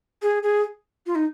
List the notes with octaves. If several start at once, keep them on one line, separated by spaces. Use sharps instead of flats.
G#4
G#4
F4
D#4